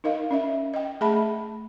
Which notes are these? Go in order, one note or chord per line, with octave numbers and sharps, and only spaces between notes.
D#4 A#4 D#5 F5
C#4 D5 E5
D#5 G5
A3 G#4 E5 A5 B5